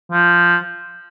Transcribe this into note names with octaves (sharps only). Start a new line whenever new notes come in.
F3